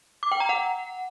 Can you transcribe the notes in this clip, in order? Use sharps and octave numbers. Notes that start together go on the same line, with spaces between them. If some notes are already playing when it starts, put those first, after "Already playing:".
D6
G5
A#5
F#5